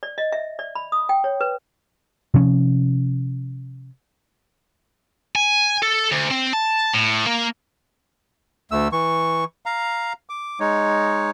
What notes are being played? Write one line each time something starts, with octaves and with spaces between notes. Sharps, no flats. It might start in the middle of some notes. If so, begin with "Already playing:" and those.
D5
D#5
E5
D5
B5
D#6
G5
C#5
B4
C3 F3 C#4
G#5
A4
D2
C4
A5
A2
A#3
D2 A3 E6
E3 C#6
F5 A#5
D6
G#3 D#4 C#5